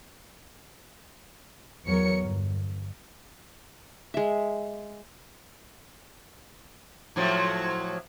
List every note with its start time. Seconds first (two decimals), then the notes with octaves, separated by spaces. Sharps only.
1.86 E2 F#3 A#4 C#5 C#7
2.20 G1
4.14 G#3 E5
7.16 A2 F3 F#3